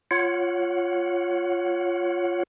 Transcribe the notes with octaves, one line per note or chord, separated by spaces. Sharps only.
F4 C#5 F#5